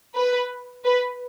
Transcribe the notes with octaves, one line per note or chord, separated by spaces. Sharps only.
B4
B4